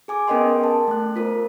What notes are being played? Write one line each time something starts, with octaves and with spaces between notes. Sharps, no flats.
G#4 G#5 D6
B3 C#4 A#4 D#5 G5 C6
A5
A3 F#6
F4 A#4 C5